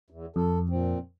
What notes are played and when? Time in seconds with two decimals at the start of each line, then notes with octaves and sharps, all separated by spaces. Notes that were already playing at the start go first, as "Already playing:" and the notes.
0.10 E2
0.36 F2 A4
0.69 A#2 F3 C4